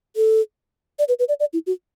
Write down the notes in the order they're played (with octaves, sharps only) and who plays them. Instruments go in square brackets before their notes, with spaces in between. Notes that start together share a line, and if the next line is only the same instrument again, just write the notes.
[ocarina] A4
D5
B4
B4
D5
D5
E4
F#4